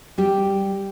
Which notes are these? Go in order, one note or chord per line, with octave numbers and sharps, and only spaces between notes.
G3 G4